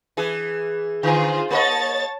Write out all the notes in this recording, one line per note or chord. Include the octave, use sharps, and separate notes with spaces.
E3 G#4
D3 F4 G#4 C5
A#3 A4 C#5 D#5 A5 A6